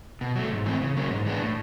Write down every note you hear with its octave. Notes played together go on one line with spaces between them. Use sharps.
B2
F#3 A3
G#2
E3 A3 C4
C#3
F#3 A#3 C#4
G#2
E3 G#3 B3 D4
A2